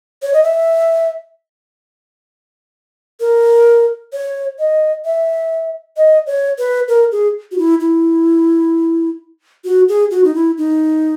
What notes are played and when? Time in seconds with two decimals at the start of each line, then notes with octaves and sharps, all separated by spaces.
0.23 C#5
0.34 D#5
0.44 E5
3.20 A#4
4.13 C#5
4.59 D#5
5.05 E5
5.97 D#5
6.27 C#5
6.59 B4
6.88 A#4
7.12 G#4
7.52 F#4
7.58 E4
7.80 E4
9.65 F#4
9.89 G#4
10.11 F#4
10.24 D#4
10.35 E4
10.58 D#4